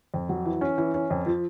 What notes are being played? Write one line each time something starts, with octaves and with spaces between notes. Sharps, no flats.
F2
F#3
E3
C#4
E3
C#4
F2
F3